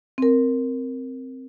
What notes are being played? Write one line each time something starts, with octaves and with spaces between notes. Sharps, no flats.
C4 A#4